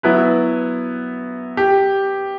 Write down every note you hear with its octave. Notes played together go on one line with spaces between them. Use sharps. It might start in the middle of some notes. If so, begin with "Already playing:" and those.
F#3 B3 E4 B4
G4